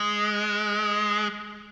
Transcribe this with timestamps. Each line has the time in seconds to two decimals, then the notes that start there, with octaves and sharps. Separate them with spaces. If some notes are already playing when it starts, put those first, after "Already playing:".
Already playing: G#3